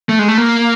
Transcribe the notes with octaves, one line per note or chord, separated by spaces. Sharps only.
A3
G#3
A3
A#3